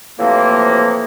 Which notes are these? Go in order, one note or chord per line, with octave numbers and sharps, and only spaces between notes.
A2 C3 E3 F3 A#3